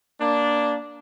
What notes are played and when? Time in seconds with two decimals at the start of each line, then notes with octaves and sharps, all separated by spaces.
0.20 A#3 D4